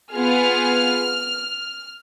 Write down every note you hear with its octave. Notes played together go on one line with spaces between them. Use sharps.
B3 F4 G#4 F6